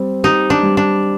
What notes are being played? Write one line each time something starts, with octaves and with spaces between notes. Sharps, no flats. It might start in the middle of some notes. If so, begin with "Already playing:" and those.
Already playing: G3 C4
D#4 G4
D4
G3
D4